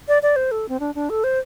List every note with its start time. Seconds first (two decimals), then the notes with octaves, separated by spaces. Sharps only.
0.08 D5
0.22 D5
0.36 C5
0.51 A4
0.69 C4
0.80 D4
0.95 D4
1.10 A4
1.24 C5